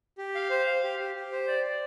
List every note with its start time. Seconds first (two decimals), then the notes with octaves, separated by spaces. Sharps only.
0.18 G4
0.35 F5
0.50 C5
0.67 F5
0.84 G4
0.99 G4
1.16 G4
1.32 C5
1.48 D5
1.64 D5